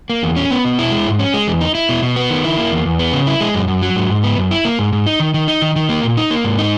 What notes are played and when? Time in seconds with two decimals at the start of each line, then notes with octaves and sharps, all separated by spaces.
0.10 A#3
0.23 E2
0.36 C#4
0.51 B3
0.65 B2
0.78 E4
0.92 G#3
1.07 G#2
1.19 C#4
1.34 G#3
1.47 E2
1.61 D#4
1.75 E4
1.89 B2
2.03 B2
2.16 B3
2.30 D#3
2.44 E4
2.58 A#3
2.71 E2
2.85 E2
2.99 B3
3.13 C#3
3.27 E4
3.41 G#3
3.54 F#2
3.68 F#2
3.82 F#3
3.96 G#2
4.10 G#2
4.24 B3
4.38 F#2
4.51 E4
4.65 A#3
4.79 G#2
4.93 G#2
5.07 D#4
5.20 D#3
5.34 D#3
5.48 D#4
5.62 D#3
5.76 D#3
5.89 A#3
6.03 A#2
6.17 D#4
6.31 A#3
6.45 G#2
6.58 D#4